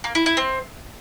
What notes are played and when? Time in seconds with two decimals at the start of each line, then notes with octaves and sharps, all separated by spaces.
0.04 A#3
0.15 E4
0.26 E4
0.37 C4